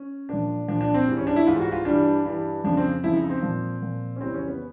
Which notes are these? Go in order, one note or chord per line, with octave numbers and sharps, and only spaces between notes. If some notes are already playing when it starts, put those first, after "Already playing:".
Already playing: C#4
A#2 F3 D4
A#2 F3 D4
D4
C4
G#2 E3 G3
C#4
D4
E4
G#2 E3 G3 F4
F#4
F4
G2 E3 G3 D4
G2 E3 G3
F2 C#3 F3 D4
C4
F2 C#3 F3 E4
D#4
C4
A#2 F3
A#2 F3
C#4
F2 C#3 E3 G3 C4
C#4
B3